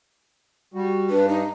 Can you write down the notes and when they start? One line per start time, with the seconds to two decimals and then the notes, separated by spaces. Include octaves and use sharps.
0.74 G3 F#4
1.10 G2 D4 B4
1.28 D#4